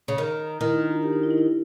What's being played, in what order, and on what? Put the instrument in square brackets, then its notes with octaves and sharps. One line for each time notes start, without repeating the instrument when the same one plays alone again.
[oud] C#3
D#3
[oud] D#3 [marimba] E4
[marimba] D#4
D4
F4
G4
D#4
E4
D#4
E4